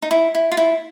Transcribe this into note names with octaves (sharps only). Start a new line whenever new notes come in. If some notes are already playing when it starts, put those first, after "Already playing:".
D#4
E4
E4
F4
E4